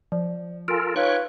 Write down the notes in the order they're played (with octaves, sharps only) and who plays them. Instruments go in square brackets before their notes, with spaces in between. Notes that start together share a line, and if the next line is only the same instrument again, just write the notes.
[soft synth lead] F3 [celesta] D5
[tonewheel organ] F4 A4 A#4 [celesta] G#5 C6 D7
[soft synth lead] D#4 [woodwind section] F4 B4 C#5 [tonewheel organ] G5 C#6 F#6